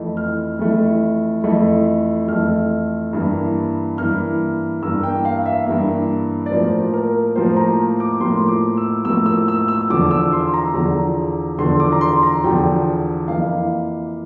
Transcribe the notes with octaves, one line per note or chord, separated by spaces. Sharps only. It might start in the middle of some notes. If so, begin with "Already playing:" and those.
Already playing: F2 E3 A3
F6
F2 E3 A3
F2 E3 A3
F2 E3 A3 F6
G2 E3 A#3
G2 E3 A#3 F6
G2 E3 A#3 E6
G5
F5
E5
G2 E3 A#3
D5
A2 F3 A#3 C5
A#4
A2 F3 A#3 C5
A#5
D6
A2 F3 A#3 C6
D6
E6
A2 F3 A#3 E6
E6
E6
E6
E2 D3 F3 D6
E6
C6
A#5
E2 D3 F3 A#5
E2 D3 F3 C6
D6
A#5
C6
A#5
E2 D3 F3 G5
F2 E3 A#3 F5